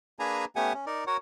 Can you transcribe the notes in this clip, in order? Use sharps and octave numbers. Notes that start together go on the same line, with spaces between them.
A#3 D4 G#4 B4 G#5 A#5
A3 B3 C#4 G4 F#5 G#5
C#4
D#4 A#4 D5
F#4 A#4 C#5 F#5